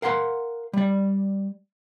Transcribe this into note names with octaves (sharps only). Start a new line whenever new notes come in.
A#4 F5 F#5 A#5 C6
G3 D5